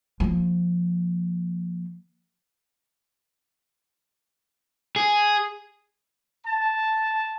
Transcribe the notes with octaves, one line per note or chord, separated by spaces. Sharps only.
F3 A#3
G#4
A5